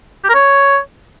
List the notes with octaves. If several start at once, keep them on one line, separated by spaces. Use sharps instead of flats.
G4
A#4
C#5